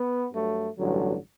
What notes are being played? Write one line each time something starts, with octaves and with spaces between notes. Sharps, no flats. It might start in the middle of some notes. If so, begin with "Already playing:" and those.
Already playing: B3
G2 F#3 A3
A1 G2 D3 F#3